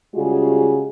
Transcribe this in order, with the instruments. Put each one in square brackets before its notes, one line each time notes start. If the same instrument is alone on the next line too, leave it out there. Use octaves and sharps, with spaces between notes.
[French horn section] C#3 G3 G#3 F4 F#4 G#4